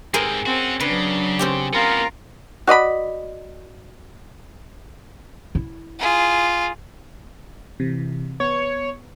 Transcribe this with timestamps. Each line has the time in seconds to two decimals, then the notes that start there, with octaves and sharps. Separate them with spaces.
0.14 G#2 C4 G#4 A#4 C5
0.46 C4 C#4 F#4
0.80 C#3 F#3 D4 B4
1.39 C4 C#4 G4
1.73 A#3 B3 F4 A#4
2.67 F#4 D5 D#5 B5
5.55 E4
5.99 F4 G#4
7.80 C3 E3
8.40 B3 C#5